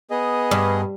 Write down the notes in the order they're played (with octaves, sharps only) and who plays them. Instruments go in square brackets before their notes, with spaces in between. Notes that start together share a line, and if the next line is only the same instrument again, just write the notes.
[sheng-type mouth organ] B3 G#4 D#5
[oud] G2